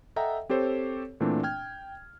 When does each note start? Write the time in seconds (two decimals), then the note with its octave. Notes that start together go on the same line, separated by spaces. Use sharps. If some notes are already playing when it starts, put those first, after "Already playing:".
0.16 A4 D#5 E5 F#5 G5 A#5
0.49 C4 G4 A4 C5 C#5
1.20 A#2 E3 A3 C4 D4
1.43 G5 F6 G#6